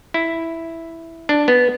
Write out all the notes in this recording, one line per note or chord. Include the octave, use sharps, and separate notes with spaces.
E4
D4
B3